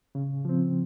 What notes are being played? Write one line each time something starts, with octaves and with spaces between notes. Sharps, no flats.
C#3
F3 C4